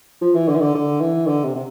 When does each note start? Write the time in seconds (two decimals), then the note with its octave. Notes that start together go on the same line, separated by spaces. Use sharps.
0.21 F3
0.35 E3
0.48 D3
0.56 E3
0.61 D3
0.74 D3
1.00 E3
1.27 D3
1.44 C3
1.55 C3